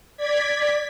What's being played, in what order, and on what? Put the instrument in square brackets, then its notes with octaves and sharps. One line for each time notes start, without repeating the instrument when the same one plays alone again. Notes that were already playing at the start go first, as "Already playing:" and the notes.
[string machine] D5 G#6 B6